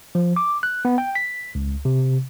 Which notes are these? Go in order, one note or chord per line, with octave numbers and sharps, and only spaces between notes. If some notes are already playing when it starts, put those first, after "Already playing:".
F3
D6
F#6
B3
G5
B6
C#2
C3